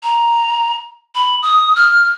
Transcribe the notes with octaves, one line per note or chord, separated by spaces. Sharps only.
A#5
B5
D#6
F6